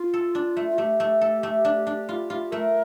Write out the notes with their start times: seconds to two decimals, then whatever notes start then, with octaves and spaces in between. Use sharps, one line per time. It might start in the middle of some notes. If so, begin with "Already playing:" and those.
Already playing: F4
0.14 A4
0.35 D4
0.57 A3
0.70 F4
0.78 A3 G4
1.00 A3
1.21 A4
1.43 A3
1.65 D4
1.87 D4
2.09 F4
2.30 F4
2.51 A3 A#4